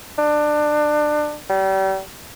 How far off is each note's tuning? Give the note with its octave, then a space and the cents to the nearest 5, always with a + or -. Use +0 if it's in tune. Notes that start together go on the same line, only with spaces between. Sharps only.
D4 +25
G3 -35